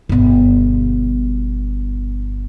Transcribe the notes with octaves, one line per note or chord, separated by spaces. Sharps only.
G1 B2